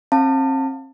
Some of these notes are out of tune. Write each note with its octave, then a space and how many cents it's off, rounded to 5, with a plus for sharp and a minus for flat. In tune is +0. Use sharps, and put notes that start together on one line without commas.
C4 +40 F5 +0 A5 +30